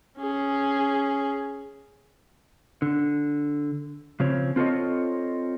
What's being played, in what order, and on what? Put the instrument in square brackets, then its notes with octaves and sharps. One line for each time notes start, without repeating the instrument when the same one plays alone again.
[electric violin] C#4 G#4
[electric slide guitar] D3
C#3 F3 C4 C#5
C4 F4 A4 B4 C#5 D#5